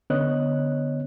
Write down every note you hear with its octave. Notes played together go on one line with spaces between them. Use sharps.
D3 B3 C#4 C#5 D#5 F#6